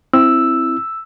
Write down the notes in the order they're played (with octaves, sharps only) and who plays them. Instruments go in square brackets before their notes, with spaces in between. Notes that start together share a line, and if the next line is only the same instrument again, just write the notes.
[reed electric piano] C4 E4 [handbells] E6